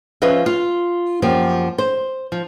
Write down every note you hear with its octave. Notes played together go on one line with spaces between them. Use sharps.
F3 C#4 F4 B4 D#5 E5
F4
F#2 F3 A#3 G4
C5
F3